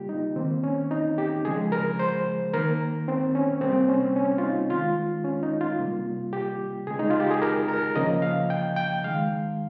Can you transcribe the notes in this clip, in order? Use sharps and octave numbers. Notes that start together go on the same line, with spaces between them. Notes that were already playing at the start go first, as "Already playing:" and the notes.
Already playing: C#3 G3 A#3 F4 G4
D#4
D#3 A#3 C4
C#4
D#4
G4
C#3 F3 G#3 G#4
A#4
C5
D#3 A#3 A#4
C4
C#4
C3 G3 A#3 C4
C#4
C#4
F4
D#4
D#3 G#3 F4
C#4
D#4
F4
C3 G3 A#3
G4
C#3 G#3 G#4
D#4
F4
G4
G#4
A#4
A#4
C#3 F3 A#3 D#5
F5
G5
G5
D#3 G#3 F5